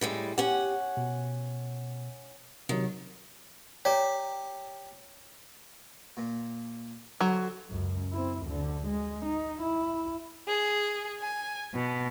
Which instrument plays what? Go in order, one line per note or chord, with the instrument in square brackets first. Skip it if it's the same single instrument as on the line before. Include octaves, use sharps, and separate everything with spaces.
[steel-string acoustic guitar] A2 G3 G#3
[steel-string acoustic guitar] C#4 F#5 [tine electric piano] G4
[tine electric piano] B2
[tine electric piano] C3 F#3 [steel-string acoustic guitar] D#3
[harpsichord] G4 [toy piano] C#5 D5 A#5
[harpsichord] A#2
[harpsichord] D3 C5 G#5 [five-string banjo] F#3
[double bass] C#2 F#2
C4 E4
D2 D3
G#3
D#4
E4
[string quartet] G#4
G#5
B2